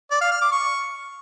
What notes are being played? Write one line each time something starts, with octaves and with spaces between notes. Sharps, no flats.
D5
F5
F6
D6
C#6